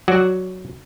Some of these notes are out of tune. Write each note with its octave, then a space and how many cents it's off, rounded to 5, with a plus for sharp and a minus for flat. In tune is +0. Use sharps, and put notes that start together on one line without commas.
F#3 +0 F#4 +0 D5 +0